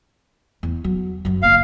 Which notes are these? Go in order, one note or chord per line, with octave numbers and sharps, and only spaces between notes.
E2
F#3
F#2 F#3
G1 A#3 F5